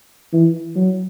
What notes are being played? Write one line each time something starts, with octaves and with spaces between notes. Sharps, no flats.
E3
F#3